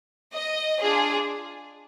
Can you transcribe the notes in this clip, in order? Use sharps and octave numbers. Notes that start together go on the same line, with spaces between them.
D#5
D4 F4 G#4